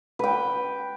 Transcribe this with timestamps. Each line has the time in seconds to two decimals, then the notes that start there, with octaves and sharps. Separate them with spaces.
0.19 B4 G5